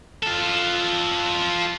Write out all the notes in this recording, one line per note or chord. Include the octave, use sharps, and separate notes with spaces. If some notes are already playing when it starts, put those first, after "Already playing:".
F4 A4